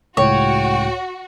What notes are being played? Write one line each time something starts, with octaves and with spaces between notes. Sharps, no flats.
C#2 A2 F#4 C#5 G5